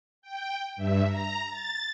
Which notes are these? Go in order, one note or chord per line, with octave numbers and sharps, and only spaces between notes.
G5
G2 E5
A#5
A6